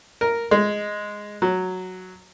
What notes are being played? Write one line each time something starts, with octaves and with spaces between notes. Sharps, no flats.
A#4
G#3
F#3